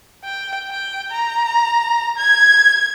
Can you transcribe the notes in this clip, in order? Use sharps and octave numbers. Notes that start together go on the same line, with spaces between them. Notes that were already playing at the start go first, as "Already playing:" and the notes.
G5
G5
A#5
G#6